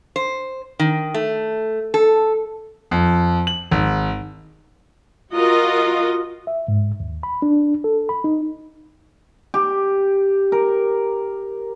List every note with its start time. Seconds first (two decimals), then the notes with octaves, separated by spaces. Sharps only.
0.16 C5
0.79 D#3
1.14 A3
1.94 A4
2.91 F2
3.47 F#7
3.71 G#1
5.33 F4 F#4 A#4 D#5
6.47 E5
6.68 G#2
7.00 D#2
7.23 B5
7.42 D4
7.84 A4
8.09 B5
8.24 D#4
9.54 G4
10.52 A#4